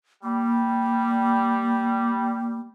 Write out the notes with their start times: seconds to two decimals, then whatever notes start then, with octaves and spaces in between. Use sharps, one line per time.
0.24 G3 A#3